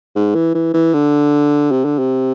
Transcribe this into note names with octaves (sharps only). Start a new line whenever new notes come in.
G#2
E3
E3
E3
D3
C3
D3
C3